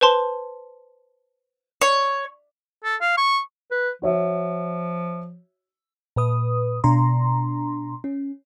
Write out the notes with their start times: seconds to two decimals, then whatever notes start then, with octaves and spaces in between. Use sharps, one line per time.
0.01 B4 C5 A5 C6
1.81 C#5
2.84 A4
3.01 F5
3.17 C#6
3.71 B4
4.02 F3 F#4 C#5 E5
6.16 A#2 B4 D#6
6.84 B2 D4 A#5 C6
8.04 C#4